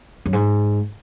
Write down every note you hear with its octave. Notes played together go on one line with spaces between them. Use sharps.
F#2
G#2